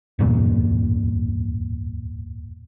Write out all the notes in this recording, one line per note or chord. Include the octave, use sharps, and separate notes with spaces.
D1 E2 G2 A#2